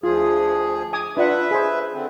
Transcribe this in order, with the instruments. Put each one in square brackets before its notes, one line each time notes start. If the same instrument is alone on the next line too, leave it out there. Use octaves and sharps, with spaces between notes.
[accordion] D2 F3 G#4 [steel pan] F4
[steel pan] G#5 D6 D#6
[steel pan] D4 F4 F#5 [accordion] B4 E5
[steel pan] G#4 C5
[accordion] D3 C4